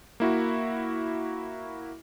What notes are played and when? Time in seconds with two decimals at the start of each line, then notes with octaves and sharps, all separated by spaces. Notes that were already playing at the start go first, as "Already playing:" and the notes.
0.20 A#3 E4 F#4